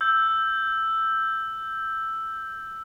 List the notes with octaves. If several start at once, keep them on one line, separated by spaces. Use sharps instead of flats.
E6 G6